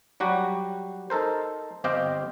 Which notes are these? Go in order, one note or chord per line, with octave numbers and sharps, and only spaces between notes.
F#3 G3 F#4 G4
D#4 A4 A#4 C5
G1 C4 G4 D#5 F5 G5